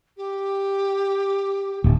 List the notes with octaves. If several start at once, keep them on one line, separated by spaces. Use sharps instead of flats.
G4
D1